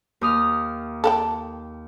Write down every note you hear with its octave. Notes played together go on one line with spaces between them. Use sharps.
D#2 D#6 F6
A4 F#5 G5